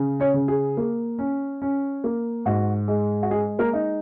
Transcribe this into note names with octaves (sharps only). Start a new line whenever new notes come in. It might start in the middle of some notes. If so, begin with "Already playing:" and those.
Already playing: C#3
C#4 C#5
C#3
G#4
A#3
C#4
C#4
A#3
G#2 F#4
G#3
F#4
G#3 G#4
A#3 A#4
D#4